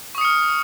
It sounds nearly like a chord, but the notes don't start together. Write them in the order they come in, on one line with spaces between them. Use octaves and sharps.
C#6 D#6 C#7 F6